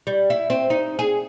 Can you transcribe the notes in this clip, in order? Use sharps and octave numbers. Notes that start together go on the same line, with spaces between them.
G3
E4
C4
D#4
G#4